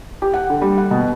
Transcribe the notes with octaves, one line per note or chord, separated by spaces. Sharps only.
G4
F#5
D3
G3
F#5
B2